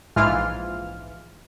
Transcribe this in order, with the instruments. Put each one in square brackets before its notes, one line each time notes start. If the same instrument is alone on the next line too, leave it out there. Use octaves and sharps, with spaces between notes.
[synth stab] A#1 G#2 E3 F4 F6